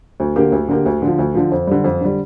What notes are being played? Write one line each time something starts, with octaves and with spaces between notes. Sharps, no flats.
D2
D3 A#3 G4
D2
D3 A#3 G4
D2
D3 F3
D2
D3 F3
F2
D3 G3
F2
D3 G3